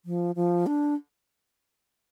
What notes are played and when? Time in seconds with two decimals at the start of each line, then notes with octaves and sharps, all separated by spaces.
0.05 F3
0.35 F3
0.66 D4